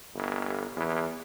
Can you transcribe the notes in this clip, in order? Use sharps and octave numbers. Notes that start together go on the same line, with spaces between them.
G1
E2